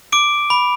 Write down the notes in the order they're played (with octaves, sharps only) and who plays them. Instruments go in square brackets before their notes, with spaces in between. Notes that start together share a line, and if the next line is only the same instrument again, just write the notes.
[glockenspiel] D6 D7
B5